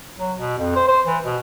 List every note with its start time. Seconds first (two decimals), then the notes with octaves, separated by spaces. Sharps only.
0.18 F#3
0.38 B2
0.58 F2
0.76 C5
0.88 C5
1.07 E3
1.25 B2